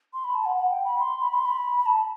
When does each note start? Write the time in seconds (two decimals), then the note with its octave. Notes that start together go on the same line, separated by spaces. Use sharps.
0.13 C6
0.24 B5
0.35 A5
0.45 F#5
0.56 F#5
0.71 G5
0.85 B5
0.99 C6
1.21 B5
1.33 C6
1.46 B5
1.79 B5
1.86 A5